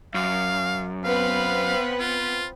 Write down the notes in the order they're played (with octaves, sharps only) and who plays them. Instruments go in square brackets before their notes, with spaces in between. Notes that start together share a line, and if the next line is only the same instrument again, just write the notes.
[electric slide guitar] F#2 [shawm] F5
[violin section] B3 C4 B4 [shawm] F5
[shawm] F4